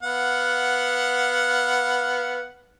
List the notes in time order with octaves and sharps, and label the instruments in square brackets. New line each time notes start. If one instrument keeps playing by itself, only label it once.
[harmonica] B3 F5 F#5